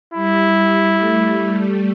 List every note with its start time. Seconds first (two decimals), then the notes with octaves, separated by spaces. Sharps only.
0.14 G3 E4
0.57 G3
1.00 A3